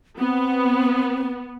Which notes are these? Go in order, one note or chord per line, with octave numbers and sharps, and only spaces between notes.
B3 C4